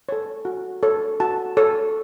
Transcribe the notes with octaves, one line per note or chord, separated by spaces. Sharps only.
A4 C#5
F#4
A4 C#5
F#4 A5
A4 C#5